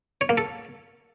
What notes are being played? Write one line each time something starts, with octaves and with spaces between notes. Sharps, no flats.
C#5
A#3
A4